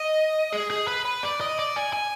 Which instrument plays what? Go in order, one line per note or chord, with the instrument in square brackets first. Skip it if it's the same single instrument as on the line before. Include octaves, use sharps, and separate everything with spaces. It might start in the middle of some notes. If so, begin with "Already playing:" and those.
Already playing: [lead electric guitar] D#5
G#4
G#4
B4
B4
D5
D#5
D5
G#5
G#5